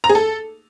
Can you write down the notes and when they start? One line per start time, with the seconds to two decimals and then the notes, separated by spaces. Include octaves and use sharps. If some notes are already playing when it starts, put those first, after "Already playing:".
0.04 A#5
0.09 G#4
0.15 A4